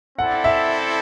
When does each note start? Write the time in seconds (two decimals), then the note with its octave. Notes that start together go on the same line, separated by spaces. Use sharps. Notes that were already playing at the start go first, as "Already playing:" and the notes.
0.19 C4 E4 A4 D5 F#5
0.44 E5